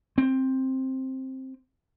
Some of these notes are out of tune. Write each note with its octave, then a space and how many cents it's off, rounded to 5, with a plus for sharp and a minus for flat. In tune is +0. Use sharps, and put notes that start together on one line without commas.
C4 +10